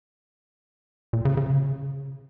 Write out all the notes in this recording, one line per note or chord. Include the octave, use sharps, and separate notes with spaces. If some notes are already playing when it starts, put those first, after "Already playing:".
A#2
C#3
C#3